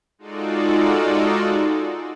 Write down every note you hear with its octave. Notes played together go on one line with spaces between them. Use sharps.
G#3 D#4 F4 F#4 A4 D5